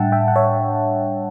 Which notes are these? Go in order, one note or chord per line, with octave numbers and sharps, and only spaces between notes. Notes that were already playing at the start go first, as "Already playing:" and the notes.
Already playing: A2 G3 D4 E5 F#5 G5 A5
E5 G5
F#5
C#5 E5